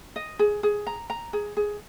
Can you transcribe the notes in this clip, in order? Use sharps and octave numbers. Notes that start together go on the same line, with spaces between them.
D#5
G#4
G#4
A#5
A#5
G#4
G#4